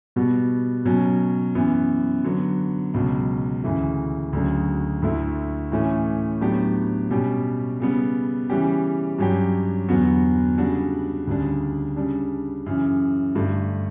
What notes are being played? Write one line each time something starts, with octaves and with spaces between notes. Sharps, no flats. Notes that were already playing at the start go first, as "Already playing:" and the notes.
B2 G3 B3 F#4
B2 F#3 C#4
F#2 E3 B3
D3 F#3 B3
C#2 B2 F#3
D2 C#3 E3 A3
D2 C#3 F#3 A3 D4
D2 D3 A3 E4
A2 E3 A3 C#4
A2 F#3 B3 D4 G4
B2 G3 C#4 G4
C#3 G3 B3
C#3 E3 G3 C#4 G4
G2 F#3 C#4 G4
E2 D3 F#3 B3 F#4
C#3 G3 D4 F#4
D2 C#3 G3 D4
C#3 G3 D4
F#2 C#3 E3
G2 D3 A3